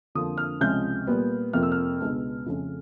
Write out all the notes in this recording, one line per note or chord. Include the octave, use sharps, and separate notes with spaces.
F2 D3 F3 A#3 D4 D#6
F6
C#2 C3 F3 G#3 C#4 G6
A#2 G3 B3
F2 C3 F3 A#3 F6
E6
F6
C#2 B2 G#3 B3 D4
F2 C#3 F3 A3 C#4